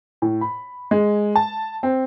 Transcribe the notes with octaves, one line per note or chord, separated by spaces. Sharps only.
A2
B5
G#3
A5
C4